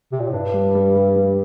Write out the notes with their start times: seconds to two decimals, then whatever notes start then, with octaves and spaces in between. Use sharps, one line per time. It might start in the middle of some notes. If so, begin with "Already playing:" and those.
0.12 C3
0.20 A#2
0.27 A2
0.34 G2 D4
0.54 G3
0.75 G3
0.95 G3
1.16 G3